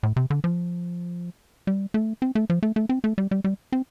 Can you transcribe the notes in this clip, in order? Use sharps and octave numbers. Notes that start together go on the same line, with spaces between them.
A2
C3
D3
F3
G3
A3
C4
A3
F3
A3
A3
C4
A3
G3
G3
G3
C4